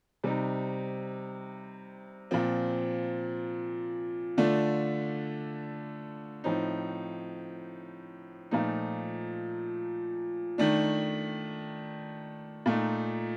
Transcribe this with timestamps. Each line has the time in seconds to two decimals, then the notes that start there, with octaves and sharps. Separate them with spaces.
0.24 C3 G3 C4 D#4
2.31 A#2 F3 C4
4.37 D3 A3 D4 F4
6.44 A2 F3 C4 D#4
8.51 A#2 F3 A3 D#4
10.58 D#3 A3 D4
12.66 A#2 A3 D#4